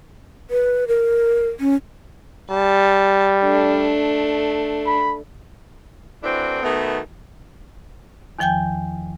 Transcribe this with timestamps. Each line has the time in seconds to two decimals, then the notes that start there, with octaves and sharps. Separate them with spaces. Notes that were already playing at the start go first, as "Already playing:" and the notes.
0.51 B4
0.88 A#4
1.60 C#4
2.50 G3 A5
3.43 A3 D4
4.86 B5
6.23 E3 A3 C4 D4 E4 F#4
6.62 B2 D#3 A3 B3
8.39 E2 D#3 F3 G5 G#5 G6